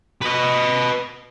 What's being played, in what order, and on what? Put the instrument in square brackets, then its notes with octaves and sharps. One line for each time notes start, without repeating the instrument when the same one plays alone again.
[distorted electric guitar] B4 D#5